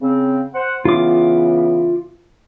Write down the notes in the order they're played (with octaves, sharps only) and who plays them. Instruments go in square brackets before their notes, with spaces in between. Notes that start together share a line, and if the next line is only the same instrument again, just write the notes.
[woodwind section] C#3 C4
C5 F#5
[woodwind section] C#3 E3 B3 [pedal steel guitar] F4 D6